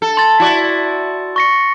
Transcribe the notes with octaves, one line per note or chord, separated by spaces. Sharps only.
A4
C6 A6
E4 F#4 D5
C#6 A#6 C#7